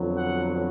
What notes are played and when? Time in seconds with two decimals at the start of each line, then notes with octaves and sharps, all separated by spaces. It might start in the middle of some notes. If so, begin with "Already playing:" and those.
Already playing: F2 D3 F#3 B3
0.18 F#5